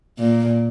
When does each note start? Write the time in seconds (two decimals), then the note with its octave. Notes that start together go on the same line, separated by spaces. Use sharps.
0.19 A#2